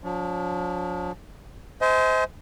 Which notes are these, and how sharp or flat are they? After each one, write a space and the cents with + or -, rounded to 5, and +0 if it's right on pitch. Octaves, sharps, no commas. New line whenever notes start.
F3 +40 D4 -45
C5 -20 D#5 +40 G#5 +20